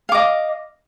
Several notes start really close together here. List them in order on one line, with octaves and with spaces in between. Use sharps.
F5 D6 D#5